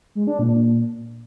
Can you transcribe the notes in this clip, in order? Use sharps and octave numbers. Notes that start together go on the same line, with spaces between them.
G#3
D4
A#2